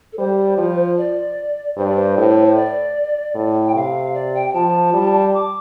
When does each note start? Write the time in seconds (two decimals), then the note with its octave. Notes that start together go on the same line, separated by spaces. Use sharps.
0.12 A4
0.18 G3 C5
0.58 F3
0.97 D5
1.77 G2 C5
1.87 D5
1.95 C5
2.17 A2
2.45 C5
2.55 D5
3.35 A2
3.66 G5
3.75 C3 F5
4.14 D5
4.35 G5
4.49 G5
4.54 F3 A5
4.94 G3
5.34 D6